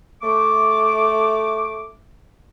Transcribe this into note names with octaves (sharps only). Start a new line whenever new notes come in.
A3 D6